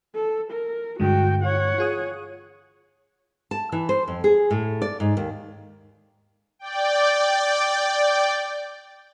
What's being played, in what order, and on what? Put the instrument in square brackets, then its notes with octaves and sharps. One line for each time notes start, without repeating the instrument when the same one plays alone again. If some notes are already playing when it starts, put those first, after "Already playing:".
[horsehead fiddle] A4
A#4
[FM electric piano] G2 D3 G#3 [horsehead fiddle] F#4 G5
[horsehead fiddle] C#5 F#5
[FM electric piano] F4 G#4 D#6
[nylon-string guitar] A5
E3
C5
F2
G#4
A2
D5
G#2
D#2
[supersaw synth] D5 G5